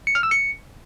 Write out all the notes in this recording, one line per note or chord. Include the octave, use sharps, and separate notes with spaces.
C#7
F6
E6
C#7